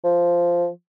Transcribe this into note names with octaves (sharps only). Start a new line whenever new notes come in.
F3